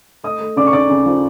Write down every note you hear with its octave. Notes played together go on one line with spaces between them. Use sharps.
A3 D#5 D#6
A3
C#3 D5 D6
C#6
C#3 D5 D6
C#3
F3